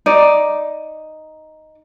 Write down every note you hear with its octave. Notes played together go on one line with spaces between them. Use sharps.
D#4 D5